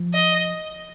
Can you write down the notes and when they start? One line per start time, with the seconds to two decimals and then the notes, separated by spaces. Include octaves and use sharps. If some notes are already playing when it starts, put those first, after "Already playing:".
Already playing: F3
0.14 D#5